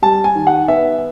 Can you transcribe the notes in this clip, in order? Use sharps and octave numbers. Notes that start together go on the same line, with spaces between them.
G3 A5
G#5
D#3
F#5
B3 E5